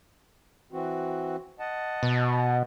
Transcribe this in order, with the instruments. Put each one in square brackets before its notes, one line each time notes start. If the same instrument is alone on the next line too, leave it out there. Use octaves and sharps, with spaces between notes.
[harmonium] E3 C4 F#4
D#5 F#5 A5
[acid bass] B2